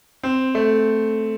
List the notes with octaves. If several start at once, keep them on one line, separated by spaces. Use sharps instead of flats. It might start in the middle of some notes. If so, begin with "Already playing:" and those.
C4
A3